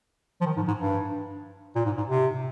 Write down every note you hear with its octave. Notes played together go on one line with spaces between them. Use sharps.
F3
D#3
G#2
G#2
G2
A#2
G#2
G#2
C3